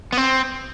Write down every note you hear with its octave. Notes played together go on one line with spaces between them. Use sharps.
B3
C4